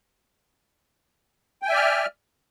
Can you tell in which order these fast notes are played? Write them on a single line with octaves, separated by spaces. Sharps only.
G5 G#5 E5 D5 F6